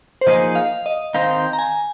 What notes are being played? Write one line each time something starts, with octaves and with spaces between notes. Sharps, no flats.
C5
F3 A#3 D#4 G#4 D#5
F5
D#5
D#3 C4 D#4 C5 D#5 F5
A#5
G#5